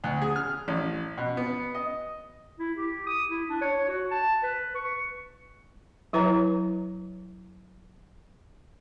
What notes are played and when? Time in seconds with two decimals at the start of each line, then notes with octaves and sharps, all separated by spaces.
0.04 D2
0.22 G#4
0.36 F6
0.68 A1
1.18 B2
1.37 B3
1.75 D#5
2.59 E4
2.77 G4
3.06 D#6
3.30 E4
3.49 D4
3.61 C#5
3.88 F#4
4.11 A5
4.43 B4
4.75 C#6
6.13 F#3 E4 B4 C#5 A#5